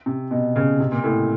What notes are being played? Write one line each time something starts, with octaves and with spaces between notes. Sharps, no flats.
C3
B2
C#3
C3
A#2
A2